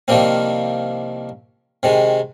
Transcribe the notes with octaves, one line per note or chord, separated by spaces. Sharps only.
C2 D#3 F3 G3 A#3 C4
C3 D#3 G#3